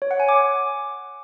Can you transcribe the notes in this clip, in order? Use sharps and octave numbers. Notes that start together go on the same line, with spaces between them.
C#5
F#5
G#5
D6